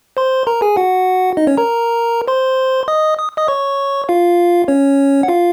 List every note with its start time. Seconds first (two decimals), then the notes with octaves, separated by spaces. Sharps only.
0.17 C5 C6
0.47 A#4 A#5
0.62 G#4 G#5
0.77 F#4 F#5
1.37 D#4 D#5
1.47 C#4 C#5
1.57 A#4 A#5
2.28 C5 C6
2.88 D#5 D#6
3.18 D#6
3.37 D#5 D#6
3.48 C#5 C#6
4.09 F4 F5
4.68 C#4 C#5
5.23 F#5
5.28 F4 F5